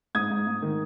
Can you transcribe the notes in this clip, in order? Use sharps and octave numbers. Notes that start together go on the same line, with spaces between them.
G#2 D#6 G#6
G#2
G#2
D#3